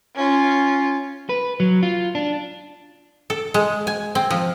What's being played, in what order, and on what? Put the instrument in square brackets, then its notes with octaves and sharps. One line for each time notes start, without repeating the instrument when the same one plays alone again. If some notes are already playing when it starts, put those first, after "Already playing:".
[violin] C#4 F4
[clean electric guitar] B4
F#3
F4
D4
[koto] A4
G#3
G#5
C4
F3